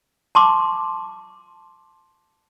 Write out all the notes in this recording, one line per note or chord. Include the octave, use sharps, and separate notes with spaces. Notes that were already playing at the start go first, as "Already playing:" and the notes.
A5 C6 D6